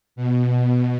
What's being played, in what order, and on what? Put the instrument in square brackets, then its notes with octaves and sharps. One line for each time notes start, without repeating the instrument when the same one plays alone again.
[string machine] B2